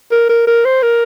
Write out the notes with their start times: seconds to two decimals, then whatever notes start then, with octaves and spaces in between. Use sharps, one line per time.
0.11 A#4
0.30 A#4
0.47 A#4
0.65 C5
0.83 A#4